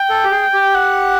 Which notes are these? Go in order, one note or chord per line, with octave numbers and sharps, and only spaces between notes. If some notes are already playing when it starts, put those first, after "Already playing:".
Already playing: G5
A4
G4
G#4
G4
F#5